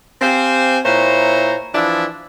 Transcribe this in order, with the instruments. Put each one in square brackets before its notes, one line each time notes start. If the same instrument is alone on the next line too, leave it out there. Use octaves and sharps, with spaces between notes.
[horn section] C4 G4 C5 F5 G#5
A#2 E4 C5 C#5 A#5
E3 F3 D4 E4